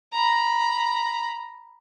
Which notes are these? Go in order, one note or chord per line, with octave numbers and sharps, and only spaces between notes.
A#5 B5